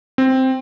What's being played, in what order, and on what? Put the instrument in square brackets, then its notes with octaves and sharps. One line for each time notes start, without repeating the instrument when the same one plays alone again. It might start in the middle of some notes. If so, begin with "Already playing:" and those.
[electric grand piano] C4